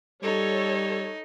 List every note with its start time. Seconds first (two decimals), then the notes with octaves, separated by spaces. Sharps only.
0.23 G3 D#4 A4 C#5